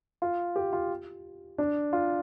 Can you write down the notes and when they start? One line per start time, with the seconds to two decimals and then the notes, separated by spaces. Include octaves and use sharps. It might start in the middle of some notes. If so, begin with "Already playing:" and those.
0.22 F4
0.56 G4
0.73 F4
1.58 D4
1.93 F4